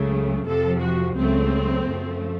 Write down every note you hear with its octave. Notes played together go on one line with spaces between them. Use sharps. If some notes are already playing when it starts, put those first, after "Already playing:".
Already playing: C#2 C#3 F#3 A3
F2 C3 F3 A4
F#4
C#2 C#3 F#3 A3 C4
F#2 F3 A3